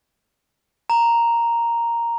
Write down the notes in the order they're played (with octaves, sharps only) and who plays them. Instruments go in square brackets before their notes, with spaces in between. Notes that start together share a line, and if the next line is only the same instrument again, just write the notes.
[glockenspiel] A#5